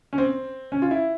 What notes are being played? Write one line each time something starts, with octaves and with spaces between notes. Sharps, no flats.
C#4
C4
C#4
F4
E4